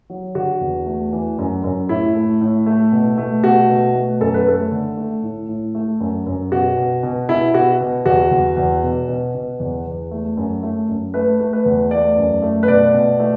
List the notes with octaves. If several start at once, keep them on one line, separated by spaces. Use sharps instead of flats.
F#3
D3 F#4
E2
A3
E3
F#2
F#2
A2 E4
A3
A2
A3
B2
A3
B2 F#4
B2
A3
F#2 A4
B4
A3 A4
D3
A3
A2
A2
A3
F#2
F#2
B2 F#4
B2
B2
B2 E4
B2 F#4
B2
E2 F#4
E2
E2
B2
B2
B2
E2
E2
A3
F#2
A3
F#2
A3 B4
A3
B4
E2
A3 D5
F#2
A3
B4
B2 D5
B2
A3